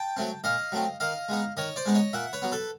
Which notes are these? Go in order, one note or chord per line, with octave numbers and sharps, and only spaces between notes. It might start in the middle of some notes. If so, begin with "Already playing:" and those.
Already playing: G5 A5
F#3 A3 C4
A#2 D#5 F5
F#3 A3 C4
D#3 D#5 F5
G#3 B3 D#4
D#3 C#5 D#5
C5 D5
G#3 B3 D#4
C#5 D#5
A#2 E5 F#5
B4 C#5
F#3 B3
A4 B4